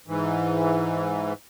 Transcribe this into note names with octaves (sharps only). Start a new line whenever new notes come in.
G#2 E3